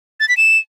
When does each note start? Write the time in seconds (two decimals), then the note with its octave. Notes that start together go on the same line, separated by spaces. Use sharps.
0.20 A6
0.29 B6
0.37 E7